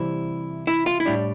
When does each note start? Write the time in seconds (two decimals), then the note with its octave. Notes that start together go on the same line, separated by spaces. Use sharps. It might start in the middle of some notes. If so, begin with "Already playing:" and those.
Already playing: C3 E3 G3 C4 E4
0.67 E4
0.86 F4
1.00 E4
1.05 A2 G3 D4